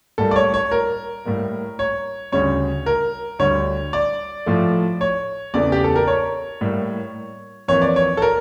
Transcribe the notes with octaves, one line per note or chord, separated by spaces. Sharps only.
A2 G3 A#3 A4
D5
C#5
C#5
A#4
A2 G3 A#3
C#5
D2 C#3 G3 C#5
A#4
D2 D3 G3 C#5
D5
A2 F3 A3
C#5
E2 C#3 E3 A3 D5
G4
A4
A#4
C#5
A2 G3 A#3
F2 E3 A#3 C#5
D5
C#5
A4
A#4